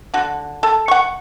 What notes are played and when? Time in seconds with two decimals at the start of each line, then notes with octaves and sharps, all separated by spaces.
0.14 D3 F#4
0.63 A4
0.88 F#5 C#6